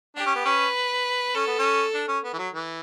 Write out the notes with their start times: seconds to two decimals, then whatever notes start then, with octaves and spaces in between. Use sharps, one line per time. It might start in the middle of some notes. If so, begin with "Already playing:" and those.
0.16 D4 G4
0.26 C#4
0.35 B3
0.45 C#4 B4
1.35 C#4 A4
1.47 B3
1.59 C#4
1.94 D4
2.08 C#4
2.24 B3
2.33 E3
2.38 F#3
2.54 E3